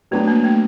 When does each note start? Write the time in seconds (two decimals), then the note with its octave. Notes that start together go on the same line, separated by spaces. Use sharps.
0.11 F#3 A3 B3 D4
0.27 A#3
0.44 A3